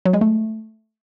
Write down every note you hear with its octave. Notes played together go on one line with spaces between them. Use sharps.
F#3
G#3
A3